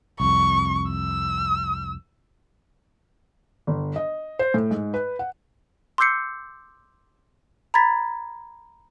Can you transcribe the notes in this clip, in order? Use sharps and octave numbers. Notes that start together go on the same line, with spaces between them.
C2 F2 C#6
E6
G1
D#5
C5
A2
G#2
B4
F#5
C6 D6 E6 G6 C7 C#7
A#5 B5 G#6 A6 B6